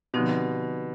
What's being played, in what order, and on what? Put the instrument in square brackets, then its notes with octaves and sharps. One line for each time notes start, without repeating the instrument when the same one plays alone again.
[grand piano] B2 [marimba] D3 F3 C4 D#4 G4